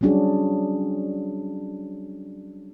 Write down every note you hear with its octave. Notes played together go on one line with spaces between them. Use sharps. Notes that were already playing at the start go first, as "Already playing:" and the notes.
F#3 G3 C#4 D4 F#4 G#4